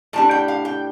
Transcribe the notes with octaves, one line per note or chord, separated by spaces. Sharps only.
A2 G3 D4 A5
G5
F5
G5